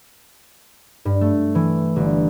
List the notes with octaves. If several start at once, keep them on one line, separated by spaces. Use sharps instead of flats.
G2
A3
E3
G1